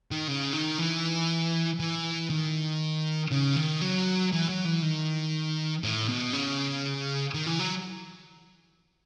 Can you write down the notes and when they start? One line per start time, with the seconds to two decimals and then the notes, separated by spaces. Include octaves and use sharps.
0.11 D#3
0.28 C#3
0.53 D#3
0.79 E3
1.80 E3
2.30 D#3
3.31 C#3
3.56 D#3
3.81 F#3
4.32 E3
4.48 F#3
4.65 E3
4.82 D#3
5.83 A2
6.09 B2
6.33 C#3
7.34 D#3
7.47 E3
7.59 F#3